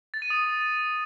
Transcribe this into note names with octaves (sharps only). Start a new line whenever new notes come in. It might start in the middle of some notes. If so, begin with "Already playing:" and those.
A6
D#7
D#6